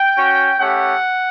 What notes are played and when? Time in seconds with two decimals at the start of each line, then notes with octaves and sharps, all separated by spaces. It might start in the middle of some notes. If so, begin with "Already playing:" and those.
Already playing: G5
0.16 C#4 F#4
0.59 A3 C#4 G4 F#5